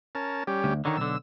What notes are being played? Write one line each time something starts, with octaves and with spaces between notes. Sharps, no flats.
C#4 A#4 A5
G3 C#4 G4
D2
D3 D#3 D#4 C#5
B1 D3 E6